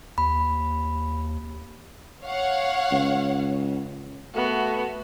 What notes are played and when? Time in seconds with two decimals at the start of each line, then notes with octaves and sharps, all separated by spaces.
0.18 D#2 B5
2.23 C#5 F5 F#5
2.91 C#2
4.34 A3 B3 F#4